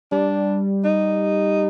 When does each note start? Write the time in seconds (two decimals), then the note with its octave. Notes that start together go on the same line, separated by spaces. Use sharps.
0.12 G3 D4
0.85 D#4